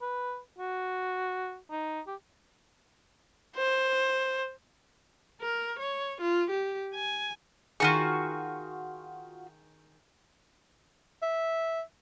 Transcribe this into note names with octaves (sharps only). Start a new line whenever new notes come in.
B4
F#4
D#4
G4
C5
A#4
C#5
F4
G4
G#5
D#3 F4 F#4 G#4 C#6
E5